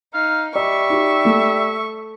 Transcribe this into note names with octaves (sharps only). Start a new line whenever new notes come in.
D#4 F5
G3 D#5 E5 C#6
D#4 G4
A3